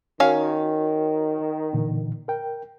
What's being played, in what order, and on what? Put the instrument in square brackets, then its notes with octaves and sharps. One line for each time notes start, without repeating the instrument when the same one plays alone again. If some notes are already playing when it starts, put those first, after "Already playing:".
[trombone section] D#3 [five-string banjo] C#4 F5 [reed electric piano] F#4 A#4 C#5
[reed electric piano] A#2 D3 E3
A#4 G5